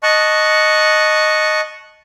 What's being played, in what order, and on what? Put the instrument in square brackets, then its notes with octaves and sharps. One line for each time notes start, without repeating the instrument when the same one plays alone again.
[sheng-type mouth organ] D#5 A5 C#6 F#6